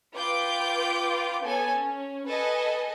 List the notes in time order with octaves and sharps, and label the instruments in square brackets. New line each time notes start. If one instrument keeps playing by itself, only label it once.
[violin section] F4 B4 G5 D6 G6 D7
B3 A4 C#5 G#5
C#4
A4 B4 D#5 G#5